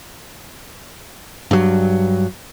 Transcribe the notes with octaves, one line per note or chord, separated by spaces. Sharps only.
G2 F#3